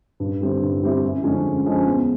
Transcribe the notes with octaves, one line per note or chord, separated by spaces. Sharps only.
G2
D3 G3 C4 E4
G2
D3 G3 C4 E4
F#2
D3 F3 G#3 C#4
F#2
D3 F3 G#3 C#4
E2